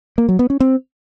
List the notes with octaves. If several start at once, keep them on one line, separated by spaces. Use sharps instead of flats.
A#3
F#3
B3
C#4
C4